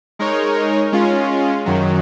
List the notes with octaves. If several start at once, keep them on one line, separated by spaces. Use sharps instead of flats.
G#3 D#4 A#4 C#5
G#3 C#4 F4
F#2 D#3 F#3